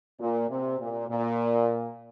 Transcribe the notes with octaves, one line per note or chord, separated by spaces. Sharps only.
A#2
C3
A#2
A#2